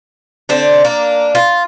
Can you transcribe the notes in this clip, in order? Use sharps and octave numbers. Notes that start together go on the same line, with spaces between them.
D3 C4 D4
A#3 D4
F4